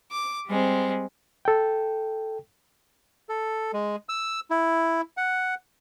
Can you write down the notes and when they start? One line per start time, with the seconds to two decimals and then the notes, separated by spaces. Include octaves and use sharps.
0.11 D6
0.48 G3 G#3 C4
1.45 A4 G5
3.29 A4
3.73 G#3
4.09 E6
4.50 E4
5.17 F#5